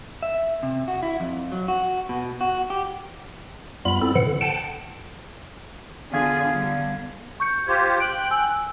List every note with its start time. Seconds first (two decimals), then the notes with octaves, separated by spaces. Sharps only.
0.23 E5
0.63 C3
0.88 F#4
1.03 E4
1.20 F2
1.52 F#3
1.68 F#4
2.09 B2
2.41 F#4
2.70 G4
3.85 F#2 G3 B3 F4 B5
4.02 C4 E4 A4
4.15 A2 C3 E3 F3 F#5
4.27 D3
4.41 F#5 G5 A5
6.12 D3 B3 F4 G#4 F5 G#6
6.53 D3 G3
7.40 C#6 G6 C#7
7.67 F4 G4 C5 G#6
8.00 G5 F#6 D7
8.31 G#5 E6